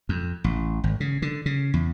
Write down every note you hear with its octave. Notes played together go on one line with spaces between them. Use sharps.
F2
A1
G#1
C#3
D3
C#3
E2